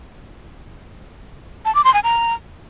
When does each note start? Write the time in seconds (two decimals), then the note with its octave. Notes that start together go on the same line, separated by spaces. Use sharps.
1.65 A5
1.75 D6
1.84 C6
1.94 G#5
2.04 A#5